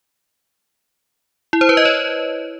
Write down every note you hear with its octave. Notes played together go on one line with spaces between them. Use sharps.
E4
C5
B4
D#5
C#5